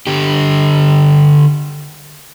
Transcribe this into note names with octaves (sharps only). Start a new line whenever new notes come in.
D3 G4